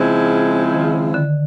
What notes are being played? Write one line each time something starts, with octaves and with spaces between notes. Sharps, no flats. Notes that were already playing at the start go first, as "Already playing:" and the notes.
Already playing: C#3 F3 G#3 C4 E4
D#3
D3